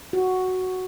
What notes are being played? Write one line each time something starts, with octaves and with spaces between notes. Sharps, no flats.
F#4